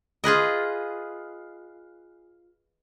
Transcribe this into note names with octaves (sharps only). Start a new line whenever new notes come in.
F4 G#4 B4 D#5